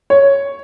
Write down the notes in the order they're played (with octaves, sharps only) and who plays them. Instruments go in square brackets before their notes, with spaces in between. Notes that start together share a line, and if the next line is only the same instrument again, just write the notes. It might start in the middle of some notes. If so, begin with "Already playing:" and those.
[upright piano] C#5